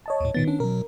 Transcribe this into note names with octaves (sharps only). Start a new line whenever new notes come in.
C#5 D#5 A5
D#2 A2
A#2 D#3 B3 A6
C#4 D4
B2 F#3 A#4